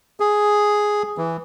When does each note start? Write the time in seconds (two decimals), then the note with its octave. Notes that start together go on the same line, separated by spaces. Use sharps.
0.20 G#4
1.18 E3